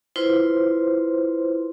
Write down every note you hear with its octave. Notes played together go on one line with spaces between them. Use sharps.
E4 F4 B4 C5 C6